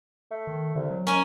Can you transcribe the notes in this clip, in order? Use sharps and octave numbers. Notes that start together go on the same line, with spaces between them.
A3
D#3
C2 D3
F#3
C#4 A#4 G#5